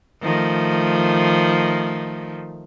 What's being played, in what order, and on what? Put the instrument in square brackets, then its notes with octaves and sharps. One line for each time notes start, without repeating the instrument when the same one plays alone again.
[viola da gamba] D#3 F3 A3